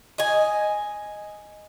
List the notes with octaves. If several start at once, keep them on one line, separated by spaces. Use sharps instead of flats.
D#5 G#5